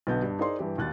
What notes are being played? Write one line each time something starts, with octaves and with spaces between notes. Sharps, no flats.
B1 D3 B3 A5 G6
G2 D4
D#4 G#4 A#4 C5 D5 C6
G2 E3 G4
G#1 D#2 F#6 A6